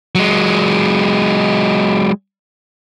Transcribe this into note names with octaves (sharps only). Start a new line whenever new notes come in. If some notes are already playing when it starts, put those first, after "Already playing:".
F#3 G#3